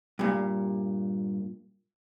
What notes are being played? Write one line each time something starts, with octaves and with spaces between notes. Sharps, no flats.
G2 A#2